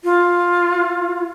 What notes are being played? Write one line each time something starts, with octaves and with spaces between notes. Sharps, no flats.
F4